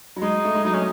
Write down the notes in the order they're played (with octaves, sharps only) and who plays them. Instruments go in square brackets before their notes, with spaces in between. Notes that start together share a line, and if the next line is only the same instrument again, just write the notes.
[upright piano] F#3
[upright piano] G#3 [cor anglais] D#4
[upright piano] A3
G#3
[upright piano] F#3 [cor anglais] D#4
[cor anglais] C#4